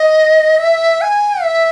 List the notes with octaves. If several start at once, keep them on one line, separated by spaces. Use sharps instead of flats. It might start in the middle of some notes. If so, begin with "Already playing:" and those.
Already playing: D#5
E5
G#5
E5